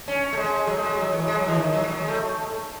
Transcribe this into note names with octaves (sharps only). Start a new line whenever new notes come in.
C#4
A3
G#3
F#3
A3
G#3
F#3
E3
G#3
F#3
E3
D#3
F#3
G#3
F#3
G#3
A3